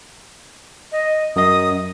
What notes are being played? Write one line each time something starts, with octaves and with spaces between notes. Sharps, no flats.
D#5
F#2 D#5 D#6